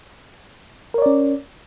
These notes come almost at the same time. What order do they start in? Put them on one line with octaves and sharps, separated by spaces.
A#4 C#5 D5 C#4